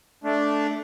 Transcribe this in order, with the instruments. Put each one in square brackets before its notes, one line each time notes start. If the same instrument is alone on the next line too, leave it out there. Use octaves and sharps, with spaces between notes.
[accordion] A3 D4